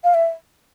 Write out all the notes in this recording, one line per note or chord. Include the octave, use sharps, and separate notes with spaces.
F5
E5